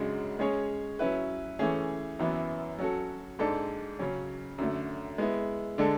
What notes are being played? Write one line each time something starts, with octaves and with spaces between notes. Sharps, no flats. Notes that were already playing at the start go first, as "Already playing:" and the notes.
Already playing: F#2 C#3 G#3 D4 F#4
G#3 C#4 G#4 C#5
F#3 C#4 E4 B4
E3 A3 C#4 G#4
F#2 E3 B3 E4
F#3 C#4 F#4 A4
G#2 G#3 D4 A4
C#3 F#3 C#4
F#2 D3 A3
G#3 B3 E4
D3 G#3 D4 A4